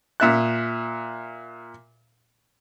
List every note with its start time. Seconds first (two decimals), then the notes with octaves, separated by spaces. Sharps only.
0.20 A#2 E5 F#6